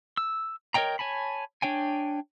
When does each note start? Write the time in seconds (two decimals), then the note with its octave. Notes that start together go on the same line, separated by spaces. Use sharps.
0.17 E6
0.74 A#4 C#5 D#5 G5 A#5
0.99 C#5 G#5 A5 B5
1.62 D4 C#5 G5 G#5